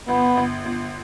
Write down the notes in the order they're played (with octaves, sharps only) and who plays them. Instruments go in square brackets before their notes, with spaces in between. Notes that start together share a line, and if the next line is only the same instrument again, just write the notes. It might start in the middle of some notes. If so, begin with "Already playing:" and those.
[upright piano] G1 [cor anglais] B3
[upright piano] G1
G1